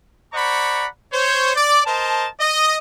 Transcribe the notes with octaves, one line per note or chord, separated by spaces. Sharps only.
C5 D5 F#5 A#5 B5 C#6
C5 C#5
D5
A#4 C5 D#5 A5
D#5